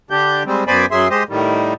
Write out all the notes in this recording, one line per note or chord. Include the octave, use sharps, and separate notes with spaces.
D3 D4 G4 G6
G3 G#3 C4
F#2 B3 C5 D5 G#5 B5
F#2 F#3 G#4 E5 C6
G#3 G4 C5 D#5
A2 D#3 G3